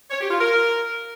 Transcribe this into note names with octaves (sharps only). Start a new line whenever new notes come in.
C#5
G4
F4
A#4